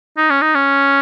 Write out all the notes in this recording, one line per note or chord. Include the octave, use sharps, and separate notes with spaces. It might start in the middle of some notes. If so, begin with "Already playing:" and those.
D#4
C#4
D#4
C#4